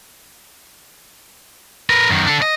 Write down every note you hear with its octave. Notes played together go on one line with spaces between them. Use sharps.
A#4 B4
F#2 D#3
D4 A4
D#5